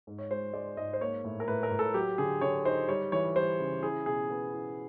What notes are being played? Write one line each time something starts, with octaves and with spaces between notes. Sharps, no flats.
G#2
C#5
G#3 C5
G#3 D5
G#2 D#5
C5
A#3 C#5
A2
A#4
A2 B4
A#4
A2
A4
F#3 G4
D3 G#4
D3 C#5
D#4 C5
G3 C#5
E3 C#5
G3 C5
C#3
E4 G#4
B2 G#4
B3
E4